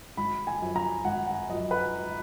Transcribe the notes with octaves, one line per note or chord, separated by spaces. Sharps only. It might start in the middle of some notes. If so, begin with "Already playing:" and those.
G#1 B5
G#5
F#2 F3
A#5
G#1 F#5
F#5
F#2 F3 D#5
B4